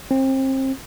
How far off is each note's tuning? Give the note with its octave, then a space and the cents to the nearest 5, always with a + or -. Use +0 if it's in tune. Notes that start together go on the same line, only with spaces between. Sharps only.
C4 +30